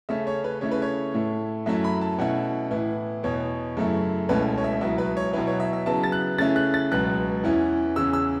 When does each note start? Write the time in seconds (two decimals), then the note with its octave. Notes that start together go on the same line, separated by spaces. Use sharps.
0.09 C#3 A3 C#4 E5
0.27 C#5
0.44 B4
0.61 C#3 A3 E4 C#5
0.71 B4
0.82 C#5
1.14 A2 A3 E4
1.66 F#2 F#3 A3 C#4 E4 E5
1.84 B5
2.01 A5
2.19 B2 A3 C#4 E4 F#5
2.71 A2 E3 B3 E4
3.23 E2 B2 B3 C#5
3.77 F#2 C#3 A3 E4
4.29 C#2 B2 A3 C#4 E4 B4
4.58 C#5
4.64 E5
4.81 C#2 B2 F#3 B3 E4 E5
4.98 B4
5.17 C#5
5.33 B2 F#3 B3 E4 B4
5.47 C#5
5.60 E5
5.73 E5
5.86 C#3 F#3 B3 E4 A5
6.04 A6
6.12 F#6
6.38 C#3 A3 C#4 E4 A6
6.56 F#6
6.74 A6
6.92 C#2 B2 F#3 B3 F#6
7.44 E2 E3 C#4 E4
7.96 E2 C#3 E3 C#4 E6
8.13 E6